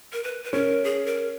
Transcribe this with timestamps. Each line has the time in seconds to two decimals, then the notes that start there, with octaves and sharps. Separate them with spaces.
0.13 A#4
0.23 B4
0.44 B4
0.53 C#4 A#4
0.84 G#4
1.06 A#4